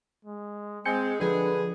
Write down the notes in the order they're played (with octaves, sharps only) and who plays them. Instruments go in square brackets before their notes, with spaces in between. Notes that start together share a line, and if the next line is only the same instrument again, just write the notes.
[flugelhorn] G#3
[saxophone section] G#3 [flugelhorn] C4 [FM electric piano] G#5 G6 C#7
[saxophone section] D3 G#4 [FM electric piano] F3 D4 [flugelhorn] B4